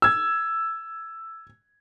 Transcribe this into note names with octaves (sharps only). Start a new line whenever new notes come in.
E6 G#6